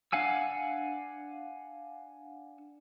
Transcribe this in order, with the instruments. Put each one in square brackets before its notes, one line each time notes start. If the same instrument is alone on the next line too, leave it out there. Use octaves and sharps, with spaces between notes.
[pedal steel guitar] D4 F5 F#5 G#5 E6